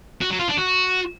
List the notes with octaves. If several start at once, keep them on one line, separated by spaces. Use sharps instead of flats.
F#4
F#3
F4
D4
F#4